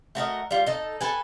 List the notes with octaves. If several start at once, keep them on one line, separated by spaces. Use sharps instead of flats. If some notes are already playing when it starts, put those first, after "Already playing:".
A3 F#4 A#4 D#5
G3 F4
D#4 A4
A4 B4 G#5